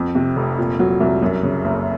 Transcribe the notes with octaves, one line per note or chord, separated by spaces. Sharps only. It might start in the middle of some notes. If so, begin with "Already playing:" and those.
Already playing: F2
C3
F1
A#2
F#3
C2
F#2
C#3
F#1